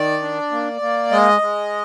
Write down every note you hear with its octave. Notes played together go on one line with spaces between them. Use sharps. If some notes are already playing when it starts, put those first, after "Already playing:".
Already playing: D#3 D5
D4
A#3
A#3
G#3 D#5
G#3